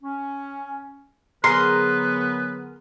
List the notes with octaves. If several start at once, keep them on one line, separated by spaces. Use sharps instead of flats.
C#4
D3 F#3 B3 G#4 A#4 B4 C6